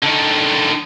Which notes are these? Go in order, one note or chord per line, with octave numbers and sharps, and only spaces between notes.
D3 D#3